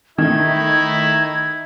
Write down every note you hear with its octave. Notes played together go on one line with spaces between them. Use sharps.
D#3 A3 D#4 E4 G#6